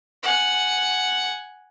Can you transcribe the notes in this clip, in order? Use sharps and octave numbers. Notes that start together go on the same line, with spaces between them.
F#5 G#5